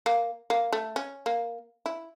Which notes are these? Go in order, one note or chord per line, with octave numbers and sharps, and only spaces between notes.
A#3
A#3
A3
C#4
A#3
E4